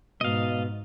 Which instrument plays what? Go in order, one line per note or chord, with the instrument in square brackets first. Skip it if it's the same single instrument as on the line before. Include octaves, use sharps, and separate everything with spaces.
[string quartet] G#2 [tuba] B2 [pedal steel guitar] D#5 F5